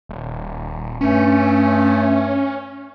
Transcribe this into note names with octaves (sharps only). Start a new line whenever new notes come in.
D#1
G2 A3 C#4